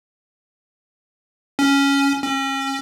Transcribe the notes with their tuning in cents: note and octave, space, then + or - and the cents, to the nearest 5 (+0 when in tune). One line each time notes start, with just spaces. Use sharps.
C#4 +5
C#4 -35